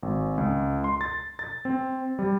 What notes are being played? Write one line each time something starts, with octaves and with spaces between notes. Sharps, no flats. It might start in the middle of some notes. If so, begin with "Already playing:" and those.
G#1
C#2
C6
A6
A6
C4
G3